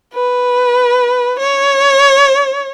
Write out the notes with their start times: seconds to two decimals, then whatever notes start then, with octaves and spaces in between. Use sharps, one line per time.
0.14 B4
1.39 C#5